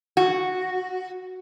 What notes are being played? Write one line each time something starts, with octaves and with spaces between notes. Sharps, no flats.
F#4